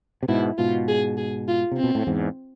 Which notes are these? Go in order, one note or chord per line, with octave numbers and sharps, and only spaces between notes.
C3
G#2 B2 E4
G#2 B2 F4
G#4
G#4
F4
C3
C4
B2
A2
E2 G#2